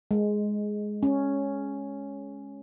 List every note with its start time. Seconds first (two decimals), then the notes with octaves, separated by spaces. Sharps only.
0.11 G#3
1.03 C#4